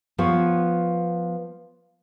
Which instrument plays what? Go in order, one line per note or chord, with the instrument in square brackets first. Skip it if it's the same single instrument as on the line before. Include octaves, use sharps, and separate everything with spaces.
[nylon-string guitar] F3 B3 F4 C#5